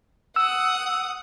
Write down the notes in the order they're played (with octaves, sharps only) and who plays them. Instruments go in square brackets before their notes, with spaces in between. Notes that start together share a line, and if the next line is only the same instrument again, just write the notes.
[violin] F#5 D#6 [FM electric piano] E6